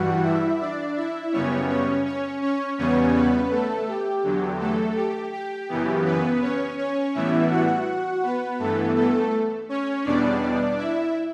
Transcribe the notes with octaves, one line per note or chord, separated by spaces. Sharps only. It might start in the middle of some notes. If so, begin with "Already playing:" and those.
Already playing: G2 E3 G3 F#4 F#5
E4 E5
D4 D5
E4 E5
F#2 C#3 G3 B3 C#4 C#5
C#4 C#5
C#4 C#5
C#4 C#5
E2 C#3 G3 B3 C#4 C#5
B3 B4
A3 A4
G4
E2 D3 F#3
A3 A4
G4
G4
F#2 C#3 E3 B3
B3 B4
C#4 C#5
C#4 C#5
A2 E3 G3 B3 E4 E5
F#4 F#5
B3 B4
G2 E3 A3 B3 A4
A3 A4
C#4 C#5
E2 B2 G3 B3 D4 D5
E4 E5